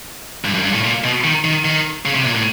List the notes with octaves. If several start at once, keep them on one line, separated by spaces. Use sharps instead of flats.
G2
F#2
G2
A2
A#2
B2
D#3
D#3
D#3
C#3
C3
A#2
A2